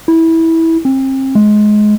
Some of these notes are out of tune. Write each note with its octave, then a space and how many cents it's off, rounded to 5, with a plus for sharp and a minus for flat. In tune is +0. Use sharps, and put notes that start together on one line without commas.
E4 -15
C4 +35
G#3 +20